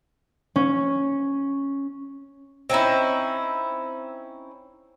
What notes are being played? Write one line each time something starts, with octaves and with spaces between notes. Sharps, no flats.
C#4
C4 C#4 D#4 E4